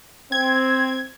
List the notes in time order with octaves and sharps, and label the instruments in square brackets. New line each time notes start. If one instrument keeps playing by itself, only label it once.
[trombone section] C4 [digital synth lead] G#6